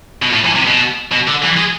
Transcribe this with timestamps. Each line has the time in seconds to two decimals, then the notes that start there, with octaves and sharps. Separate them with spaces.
0.23 B2
0.33 A2
0.45 E3
0.56 C3
0.67 B2
1.12 B2
1.28 D3
1.43 E3
1.57 G#3